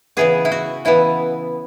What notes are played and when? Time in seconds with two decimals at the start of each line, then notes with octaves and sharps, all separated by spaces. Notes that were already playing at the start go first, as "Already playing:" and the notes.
0.17 C#3 E3 B3 G#4
0.45 E4
0.52 F#4
0.85 C#3 E3 B3 E4